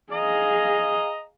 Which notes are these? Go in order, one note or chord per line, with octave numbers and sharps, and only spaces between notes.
G#4 D#5 F5 A#5